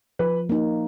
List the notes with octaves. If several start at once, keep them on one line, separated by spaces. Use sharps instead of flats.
F3 B4
A#3 D#4